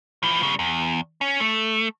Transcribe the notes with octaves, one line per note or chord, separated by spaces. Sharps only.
E3 F3
C#3 G3
E2
C#4
A3